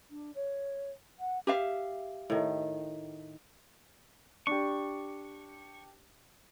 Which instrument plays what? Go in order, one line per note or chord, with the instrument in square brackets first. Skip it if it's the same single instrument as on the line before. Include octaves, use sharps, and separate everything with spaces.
[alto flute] D4
C#5
F#5
[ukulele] G4 E5 F5
[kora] A2 D#3
[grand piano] D4 G4 [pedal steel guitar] C#6